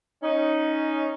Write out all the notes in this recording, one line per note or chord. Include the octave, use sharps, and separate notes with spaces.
C#4 D#4